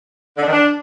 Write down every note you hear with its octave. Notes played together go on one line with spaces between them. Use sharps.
D3
D4
D#3
D4